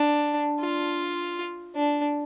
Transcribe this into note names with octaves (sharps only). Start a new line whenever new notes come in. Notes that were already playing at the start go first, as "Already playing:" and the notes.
Already playing: D4
F4
D4